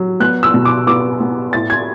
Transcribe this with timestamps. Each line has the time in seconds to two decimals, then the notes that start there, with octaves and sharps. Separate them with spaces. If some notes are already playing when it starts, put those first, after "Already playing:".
Already playing: F#3
0.20 B3 F#6
0.43 E6
0.54 B2
0.65 D6
0.87 B3 D6
1.20 B3
1.53 A2 A6
1.70 G#6